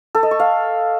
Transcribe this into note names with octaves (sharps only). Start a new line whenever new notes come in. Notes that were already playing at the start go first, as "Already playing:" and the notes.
A4
D#5
C#6
F5